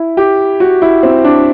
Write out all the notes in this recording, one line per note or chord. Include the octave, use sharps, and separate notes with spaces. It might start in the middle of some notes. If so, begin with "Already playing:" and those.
Already playing: E4
G4
F#4
E4
C4
D4